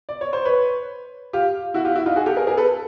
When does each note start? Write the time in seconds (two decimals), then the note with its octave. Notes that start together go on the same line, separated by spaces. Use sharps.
0.09 D5
0.21 C#5
0.33 C5
0.45 B4 C#5
1.33 F4 G4
1.74 E4 F#4
1.85 F4 G4
1.95 E4 F#4
2.06 D#4 F4
2.16 F#4 G#4
2.26 G4 A4
2.37 G#4 A#4
2.47 G#4 A#4
2.57 A4 B4